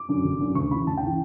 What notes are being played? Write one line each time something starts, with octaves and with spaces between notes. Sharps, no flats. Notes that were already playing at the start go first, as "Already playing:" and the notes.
Already playing: D6
F#2 D3
G1
F#2 D3
D2 C#6
C#3 E3 B5
D2 A5
G5
C#3 E3